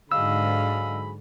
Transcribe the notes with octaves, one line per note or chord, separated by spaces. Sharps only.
G#2 D3 F#3 G#4 D#5 F5 B5 E6